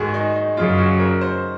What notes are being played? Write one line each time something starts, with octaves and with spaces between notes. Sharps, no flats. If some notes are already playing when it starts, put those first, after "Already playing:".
Already playing: G#2 D#3 G#3 F#4 G#4
D#4
D#4
F#2 C#3 F#3 F4
F#4
A#4
C5